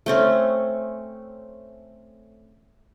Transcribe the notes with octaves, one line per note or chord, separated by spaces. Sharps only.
A3 C4 C#4